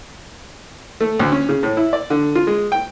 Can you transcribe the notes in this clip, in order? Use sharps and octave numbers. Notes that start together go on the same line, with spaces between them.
A3
D2
C#4
C#3
A2
E4
D5
D3
F4
G#3
G5